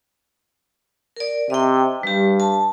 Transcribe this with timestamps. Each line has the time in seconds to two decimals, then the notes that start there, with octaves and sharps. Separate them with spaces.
1.17 A#4 D5
1.50 C3 D#5 G5
2.03 G2 G3 G4
2.40 A5